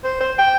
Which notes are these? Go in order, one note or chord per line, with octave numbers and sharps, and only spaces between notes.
C5
C5
G5